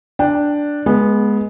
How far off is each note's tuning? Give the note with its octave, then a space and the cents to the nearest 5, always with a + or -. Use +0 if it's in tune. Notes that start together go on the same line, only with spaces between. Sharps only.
D4 +0 G5 +0
G#3 +10 B3 -15